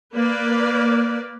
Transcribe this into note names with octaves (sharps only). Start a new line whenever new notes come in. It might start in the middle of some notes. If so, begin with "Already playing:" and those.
A#3 B4 D5